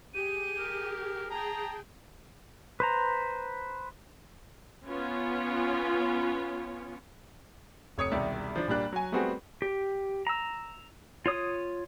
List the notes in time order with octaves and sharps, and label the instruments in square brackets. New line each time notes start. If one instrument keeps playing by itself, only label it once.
[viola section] G4 G#4 [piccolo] D#7
[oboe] A#4
[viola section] G#4 G5 [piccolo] A5 [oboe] A#5
[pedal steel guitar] B4 C5 A#5
[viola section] B3 C#4 F4
[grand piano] F1 C#5 D#6 C#7
E1 C2 D#3 D5 E5
F3 D4
A#1 A#2 G3 A#3 D4 F#6
F#3 G#5
G3 A3 B3 C4 F#4 G#4
[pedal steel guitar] G4
A#5 E6
F4 C#5 D#6